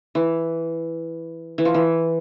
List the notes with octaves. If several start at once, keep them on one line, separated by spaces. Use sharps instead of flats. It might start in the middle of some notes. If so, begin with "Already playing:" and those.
E3
E3
F3
E3